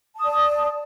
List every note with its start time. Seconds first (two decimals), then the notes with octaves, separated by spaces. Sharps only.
0.16 A5
0.20 D#6
0.24 D5